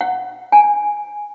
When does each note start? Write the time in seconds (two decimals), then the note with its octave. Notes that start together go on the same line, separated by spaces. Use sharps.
0.01 F#5
0.52 G#5